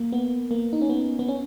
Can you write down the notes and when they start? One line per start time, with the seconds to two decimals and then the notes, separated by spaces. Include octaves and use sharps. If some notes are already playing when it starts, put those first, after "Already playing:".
Already playing: A#3
0.12 B3
0.51 A#3
0.73 D#4
0.81 C#4
0.89 B3
1.19 B3
1.28 C#4